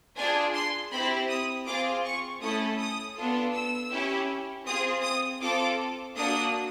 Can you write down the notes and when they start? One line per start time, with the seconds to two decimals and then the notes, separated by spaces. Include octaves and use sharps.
0.17 D4 F4 G#4 G#5
0.53 C6
0.92 C4 E4 G4 B5
1.29 D#6
1.67 C4 F4 G#4 D6
2.04 C#6
2.41 A3 C#4 E4 A4 D#6
2.79 D#6
3.17 B3 D4 F4 A4
3.54 E6
3.92 C#4 E4 G4
4.66 C4 F4 G#4 D#6
5.04 D#6
5.41 C4 F4 A4 D6
6.16 A#3 D4 F#4 D#6